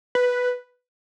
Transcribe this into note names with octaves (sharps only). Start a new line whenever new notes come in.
B4